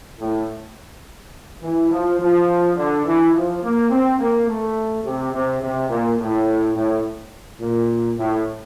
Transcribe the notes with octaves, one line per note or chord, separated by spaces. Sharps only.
A2
E3
F3
F3
D3
E3
F3
A#3
C4
A#3
A3
C3
C3
C3
A#2
A2
A2
A#2
A2